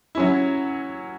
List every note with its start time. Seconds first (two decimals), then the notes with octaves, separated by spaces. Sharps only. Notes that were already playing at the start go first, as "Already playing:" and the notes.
0.15 F#3 C#4 E4